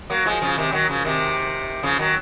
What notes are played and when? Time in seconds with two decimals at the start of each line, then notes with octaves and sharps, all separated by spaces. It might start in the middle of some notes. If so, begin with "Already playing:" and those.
0.10 F#3 A#3
0.26 F3 G#3
0.42 C#3 F3
0.58 C3 D#3
0.72 D#3 F#3
0.89 C#3 F3
1.05 C3 D#3
1.83 C#3 F3
1.99 D#3 F#3